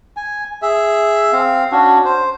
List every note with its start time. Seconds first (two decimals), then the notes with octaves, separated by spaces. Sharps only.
0.17 G#5
0.62 G#4 E5
1.33 C4 F5
1.72 C#4 D4 F#4
2.05 C5